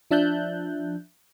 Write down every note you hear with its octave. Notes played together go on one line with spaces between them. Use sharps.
F3 D4 E5 A5 F#6 G6